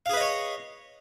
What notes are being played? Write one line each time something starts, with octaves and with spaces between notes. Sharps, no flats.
G#4 B4 C#5 D#5 F5